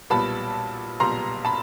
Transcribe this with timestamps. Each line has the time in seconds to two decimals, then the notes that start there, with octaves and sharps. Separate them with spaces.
0.10 B1 A#2 G3 B3 A5 B5
1.00 B1 A#2 G3 B3 A#5 C6
1.45 A5 B5